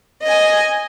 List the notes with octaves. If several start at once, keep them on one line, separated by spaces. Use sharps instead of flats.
D#5 G#5